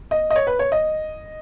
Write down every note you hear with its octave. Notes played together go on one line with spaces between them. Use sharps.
D#5
D#5
C#5
B4
C#5
D#5